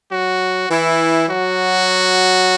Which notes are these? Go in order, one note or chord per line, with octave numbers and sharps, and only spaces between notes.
F#3 F#4
E3 E4
F#3 F#4